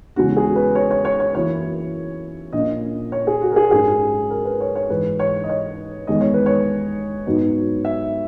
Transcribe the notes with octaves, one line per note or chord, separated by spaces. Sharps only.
E2 C#3 G#3 C#4 E4 F#4
G#4
B4
C#5
C#5
C#5
C#5
F#2 E3 A#3 E4 C#5
A#1 A#2 A#3 C#4 D#5
C#5
G#4
F#4
A#4
G#4
G#2 F#3 C#4 G#4
A#4
B4
C#5
C#5
G#2 E3 G#3 D#4 B4
C#5
D#5
C#5
E2 D#3 G#3 B3 D#5
C#5
B4
C#5
G#2 F#3 B3 D#4
E5